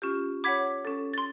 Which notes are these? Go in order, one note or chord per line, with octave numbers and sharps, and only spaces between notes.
C#4 F4 G4
C#5 F#5 B5 D6 G#6 B6
C#4 A4
C6 A6